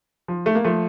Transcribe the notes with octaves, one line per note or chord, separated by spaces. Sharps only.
F3
A3
A#3
F3 A3